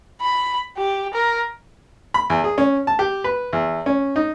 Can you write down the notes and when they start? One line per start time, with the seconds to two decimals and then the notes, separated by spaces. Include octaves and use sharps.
0.21 B5
0.78 G4
1.14 A#4
2.14 B5
2.30 E2
2.44 G#4
2.58 C#4
2.87 A5
2.99 G4
3.24 B4
3.53 E2
3.86 C#4
4.16 D#4